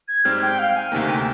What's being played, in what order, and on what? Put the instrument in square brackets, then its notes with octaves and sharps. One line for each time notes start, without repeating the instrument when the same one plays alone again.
[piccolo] G#6
[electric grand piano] G#2 G3 C4 [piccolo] F6
[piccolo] G5
F5
G#5
[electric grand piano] D2 C3 D#3 A#3 [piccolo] G#5
[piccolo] G5